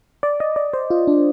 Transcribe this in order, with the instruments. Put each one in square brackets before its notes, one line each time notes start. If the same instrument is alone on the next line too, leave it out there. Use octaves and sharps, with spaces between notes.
[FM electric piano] D5
D#5
D5
C5
F4
D4